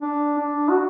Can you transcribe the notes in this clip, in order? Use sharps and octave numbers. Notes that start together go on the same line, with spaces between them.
D4
D4
F#4